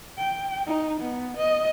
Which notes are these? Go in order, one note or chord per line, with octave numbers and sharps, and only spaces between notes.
G5
D#4
B3
D#5